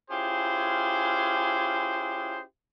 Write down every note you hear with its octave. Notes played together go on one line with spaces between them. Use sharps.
C#4 E4 F4 G4 G#4 C5